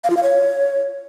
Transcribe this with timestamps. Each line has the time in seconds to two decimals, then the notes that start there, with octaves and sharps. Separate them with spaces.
0.04 F5
0.10 F4
0.17 F5
0.23 C#5